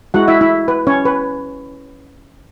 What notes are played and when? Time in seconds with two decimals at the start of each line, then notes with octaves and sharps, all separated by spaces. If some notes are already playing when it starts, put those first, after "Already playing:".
0.14 G#3 E4 F#4 F#5
0.28 E4 E5
0.41 E4 E5
0.68 B4
0.87 C#4 C#5
1.05 B4